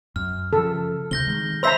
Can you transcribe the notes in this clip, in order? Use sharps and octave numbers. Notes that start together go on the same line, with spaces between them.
F#2 F6
C#3 F3 A4
D2 C3 C4 G6 A#6 G7
D#3 G#3
C5 E5 A#5 B5 E6 B6